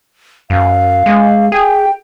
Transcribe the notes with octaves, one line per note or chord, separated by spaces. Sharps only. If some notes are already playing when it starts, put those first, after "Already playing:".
F#2 F5
G#3
G#4 G5